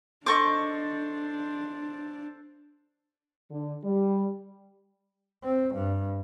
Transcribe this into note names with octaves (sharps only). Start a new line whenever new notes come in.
D4 A4 C5 D#5 C#6 D6
D3
G3
C4
G2